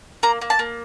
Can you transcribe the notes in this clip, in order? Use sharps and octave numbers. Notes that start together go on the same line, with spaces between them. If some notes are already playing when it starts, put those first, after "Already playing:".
A#3 A#5
A#3
A5
A#3